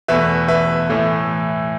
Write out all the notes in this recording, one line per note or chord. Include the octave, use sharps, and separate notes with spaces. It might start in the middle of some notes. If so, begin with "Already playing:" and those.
E2 B2 A3 B4 E5
B4 E5
A2 E3 A3